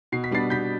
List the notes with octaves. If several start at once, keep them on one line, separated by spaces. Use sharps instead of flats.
B2 C7
B6
G3 B3 D4 A6 C7
B2 G6 B6